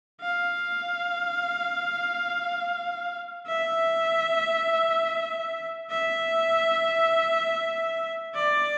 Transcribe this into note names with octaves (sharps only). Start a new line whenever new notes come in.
F5
E5
E5
D5